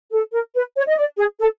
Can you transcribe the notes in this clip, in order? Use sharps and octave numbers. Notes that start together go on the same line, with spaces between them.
A4
A#4
B4
C#5
D#5
D5
G#4
A4